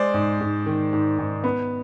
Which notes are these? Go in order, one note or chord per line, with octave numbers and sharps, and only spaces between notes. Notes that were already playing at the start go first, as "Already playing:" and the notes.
Already playing: G#3 C5 D5
G#2
G#2
D#3
G#2
G#2
B3